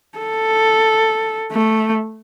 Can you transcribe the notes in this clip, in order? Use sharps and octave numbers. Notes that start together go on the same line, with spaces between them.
A4
A3